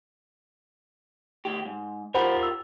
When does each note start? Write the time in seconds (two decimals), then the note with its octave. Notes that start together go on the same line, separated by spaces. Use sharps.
1.45 D2 G4
1.65 G#2
2.14 F4 G4 A#4 C5 F#5 B5
2.43 E6